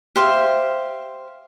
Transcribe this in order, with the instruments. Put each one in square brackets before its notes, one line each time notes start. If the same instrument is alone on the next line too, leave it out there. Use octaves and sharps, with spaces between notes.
[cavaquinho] G4 C5 E5 F5